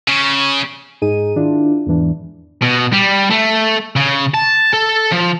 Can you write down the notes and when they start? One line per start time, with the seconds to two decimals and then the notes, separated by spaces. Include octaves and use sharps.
0.08 C#3
1.02 G#2 D#4 G#4 D#7
1.36 D#3 D4 E4 F4
1.86 E2 G#2 E3 D4
2.62 B2
2.92 G3
3.30 A3
3.96 C#3
4.34 A5
4.73 A4
5.11 F3